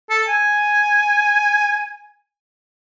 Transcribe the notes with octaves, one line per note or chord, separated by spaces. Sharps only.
A4
G#5